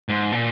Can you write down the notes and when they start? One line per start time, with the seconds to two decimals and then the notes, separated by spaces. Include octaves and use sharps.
0.09 G#2
0.32 A#2